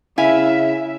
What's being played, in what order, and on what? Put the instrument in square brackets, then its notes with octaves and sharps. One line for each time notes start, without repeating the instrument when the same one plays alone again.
[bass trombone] C#3 [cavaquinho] E4 F5 G#5 [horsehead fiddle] E5